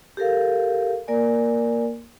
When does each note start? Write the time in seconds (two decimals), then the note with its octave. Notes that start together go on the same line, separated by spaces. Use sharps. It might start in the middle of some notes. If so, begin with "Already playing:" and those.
0.17 G4 A4 A#4 F5
1.08 A#3 A#4 D5 G#5